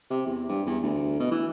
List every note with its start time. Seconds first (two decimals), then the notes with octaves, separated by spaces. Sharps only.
0.10 C3
0.26 E2
0.49 G2
0.66 E2
0.83 D2
1.20 B2
1.32 E3